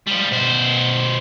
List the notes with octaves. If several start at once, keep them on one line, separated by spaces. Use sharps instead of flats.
F3 G3
B2 C5